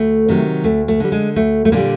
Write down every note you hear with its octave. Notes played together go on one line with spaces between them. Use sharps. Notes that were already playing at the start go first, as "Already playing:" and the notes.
Already playing: D2 A3
C3 D#3 F#3
D2 A3
A3
D3 G3
G#3
D2 A3
A3
A#2 D3 G3 A#3